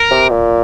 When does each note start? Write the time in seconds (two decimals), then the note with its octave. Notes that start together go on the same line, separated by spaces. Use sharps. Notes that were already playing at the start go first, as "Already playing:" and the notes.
Already playing: A#4
0.11 C3
0.30 A#2